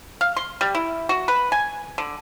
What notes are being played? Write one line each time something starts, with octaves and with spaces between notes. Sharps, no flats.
F5
C6
G3
E4
F#4
B4
G#5
D3